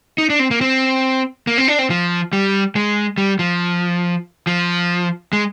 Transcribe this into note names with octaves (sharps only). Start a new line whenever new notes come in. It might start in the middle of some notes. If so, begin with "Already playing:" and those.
D#4
D4
C4
A#3
C4
A#3
C4
D4
C4
F3
G3
G#3
G3
F3
F3
G#3